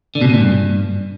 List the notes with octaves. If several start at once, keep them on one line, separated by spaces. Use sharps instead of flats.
D3
B2
C3
A#2
G2